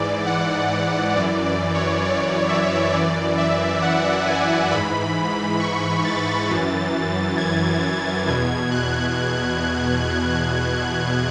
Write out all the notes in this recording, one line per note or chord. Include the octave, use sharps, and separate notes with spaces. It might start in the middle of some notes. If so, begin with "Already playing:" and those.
Already playing: G#2 E3 D5
F#5
F#2 E3 D5
D5
C#5
D5
E5
F#2 E3 D5
E5
F#5
G#5
G#2 E3 B5
C#6
A6
F#2 E3
G#6
E2 B2 G#6
F#6